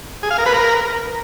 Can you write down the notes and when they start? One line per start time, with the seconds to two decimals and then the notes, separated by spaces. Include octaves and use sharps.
0.23 G#4
0.31 F5
0.38 A#4
0.46 B4
0.54 A#4